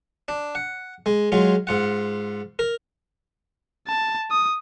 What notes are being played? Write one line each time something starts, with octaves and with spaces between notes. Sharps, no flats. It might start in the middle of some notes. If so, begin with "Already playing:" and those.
D4
F#5
G#3
F#3 G#3 F4
G#2 F4 F#5
A#4
A5
D#6